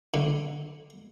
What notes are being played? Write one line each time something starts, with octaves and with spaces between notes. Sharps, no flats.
D3